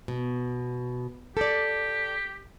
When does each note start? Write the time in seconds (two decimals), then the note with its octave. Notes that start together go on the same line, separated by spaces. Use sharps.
0.08 B2
1.37 G4 A4 D5